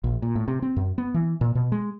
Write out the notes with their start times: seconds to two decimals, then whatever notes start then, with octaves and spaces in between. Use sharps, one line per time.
0.04 A#1
0.22 A#2
0.35 A2
0.48 C3
0.62 C4
0.76 F#2
0.98 B3
1.14 E3
1.41 A#2
1.55 B2
1.72 G#3